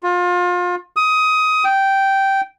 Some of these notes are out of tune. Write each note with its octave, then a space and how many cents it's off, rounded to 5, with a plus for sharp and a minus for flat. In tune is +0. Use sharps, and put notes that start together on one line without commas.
F4 +30
D#6 +20
G5 -10